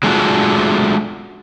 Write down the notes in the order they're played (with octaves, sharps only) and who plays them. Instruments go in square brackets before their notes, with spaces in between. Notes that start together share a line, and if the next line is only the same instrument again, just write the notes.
[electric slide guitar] F#3 G#3 A3 D4 F4 F#4